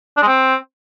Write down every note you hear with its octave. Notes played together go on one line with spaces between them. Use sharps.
D4
G#3
C4